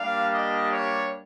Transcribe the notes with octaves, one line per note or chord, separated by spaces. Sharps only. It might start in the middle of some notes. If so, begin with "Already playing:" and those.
Already playing: G3 A#3 D4 G4 F5
D#5
C#5